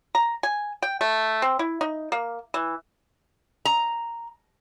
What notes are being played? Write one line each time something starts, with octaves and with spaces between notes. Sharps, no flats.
A#5
G#5
G5
A3
C4
E4
D#4
A#3
E3
A#5